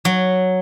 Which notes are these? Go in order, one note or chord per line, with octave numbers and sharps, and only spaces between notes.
F#3